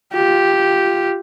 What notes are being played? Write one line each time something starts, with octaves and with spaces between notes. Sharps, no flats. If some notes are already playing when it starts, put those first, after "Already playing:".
F4 G4